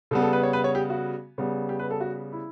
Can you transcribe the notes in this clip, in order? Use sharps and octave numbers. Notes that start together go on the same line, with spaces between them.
C#3 G3 B3 A4
A4
B4
C#5
B4
C#5
G4
F#4
C#3 G3 B3
G4
B4
A4
F#4
E4